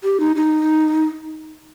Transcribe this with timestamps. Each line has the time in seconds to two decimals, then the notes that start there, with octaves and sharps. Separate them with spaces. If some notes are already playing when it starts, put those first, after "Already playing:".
0.04 G4
0.20 D#4
0.36 D#4